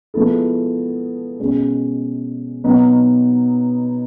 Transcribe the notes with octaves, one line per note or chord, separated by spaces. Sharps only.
F3 G#3 B3 E4 A4
B2 G#3 C#4
B2 F#3 B3 D#4